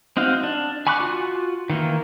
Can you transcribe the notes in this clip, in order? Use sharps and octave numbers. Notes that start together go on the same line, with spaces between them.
C4 D#4 F#4 F5
D4
G#5 B5 C#6 D6 F#6
F4 F#4
D#3 E3 A#3